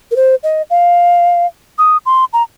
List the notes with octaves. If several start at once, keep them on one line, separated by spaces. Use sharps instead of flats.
A#4
C5
D#5
F5
D#6
C6
A#5